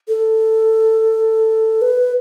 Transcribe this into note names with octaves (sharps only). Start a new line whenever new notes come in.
A4
B4